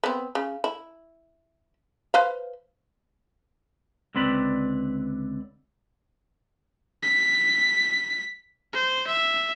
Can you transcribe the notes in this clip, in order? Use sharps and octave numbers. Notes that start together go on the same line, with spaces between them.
B3 C4
C#3
E4
B4 C5 F5
C#2 D3 C4 B4 D5 B5
B6
C5
E5